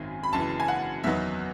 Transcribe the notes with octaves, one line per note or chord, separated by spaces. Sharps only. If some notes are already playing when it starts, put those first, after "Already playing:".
Already playing: G#1 F#2 D#3 G#5
B5
F#1 F#2 E3 A5
G#5
F#5
E2 D#3 F#3 B3 D#4 E5